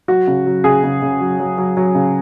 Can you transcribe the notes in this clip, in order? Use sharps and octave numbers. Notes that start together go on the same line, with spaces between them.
F#3 F#4
C#3
F#3
C#3 G#4
C#3
C#3
F#3
F#3
F#3
F#3
C#3